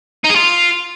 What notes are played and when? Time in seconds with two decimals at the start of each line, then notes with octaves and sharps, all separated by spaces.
0.24 D#4
0.30 G#4
0.35 F4